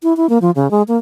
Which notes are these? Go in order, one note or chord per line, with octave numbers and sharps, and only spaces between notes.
E4
E4
A#3
F3
C#3
G#3
A#3